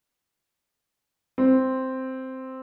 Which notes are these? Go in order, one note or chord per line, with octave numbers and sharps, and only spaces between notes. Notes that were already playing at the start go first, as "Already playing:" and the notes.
C4